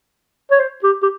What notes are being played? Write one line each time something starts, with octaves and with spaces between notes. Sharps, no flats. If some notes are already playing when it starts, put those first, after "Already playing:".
C#5
C5
G4
G4